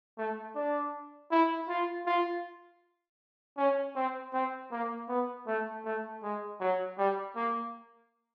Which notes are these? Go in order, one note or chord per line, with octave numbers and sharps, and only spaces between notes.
A3
D4
E4
F4
F4
C#4
C4
C4
A#3
B3
A3
A3
G#3
F#3
G3
A#3